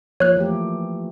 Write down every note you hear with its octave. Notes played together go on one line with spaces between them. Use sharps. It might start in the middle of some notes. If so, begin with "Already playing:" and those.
F3 A#3 C#5 F#6
E3 A3 G4